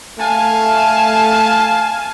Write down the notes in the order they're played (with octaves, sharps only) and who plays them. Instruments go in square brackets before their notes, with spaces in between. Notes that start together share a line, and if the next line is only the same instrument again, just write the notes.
[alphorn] A3 [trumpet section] F5 A5 [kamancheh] G#5